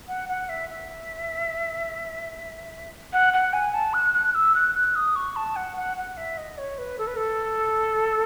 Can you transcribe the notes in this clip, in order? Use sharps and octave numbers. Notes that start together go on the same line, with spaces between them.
F#5
F#5
E5
E5
F#5
F#5
G#5
A5
F#6
F#6
E6
F#6
F#6
D#6
C#6
A5
F#5
F#5
F#5
E5
D#5
C#5
B4
A4
B4
A4